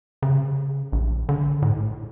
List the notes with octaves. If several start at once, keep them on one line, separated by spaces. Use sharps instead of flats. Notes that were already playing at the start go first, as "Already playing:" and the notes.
C#3
A#1
D3
A2